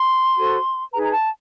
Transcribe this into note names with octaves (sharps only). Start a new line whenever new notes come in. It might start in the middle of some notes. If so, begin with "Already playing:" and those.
Already playing: C6
F#4 A4 C5
D#4 G#4 B4 A#5
A#5
A5